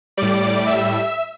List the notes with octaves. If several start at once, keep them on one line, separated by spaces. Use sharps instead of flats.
A2 G3 D5 D6
E5 E6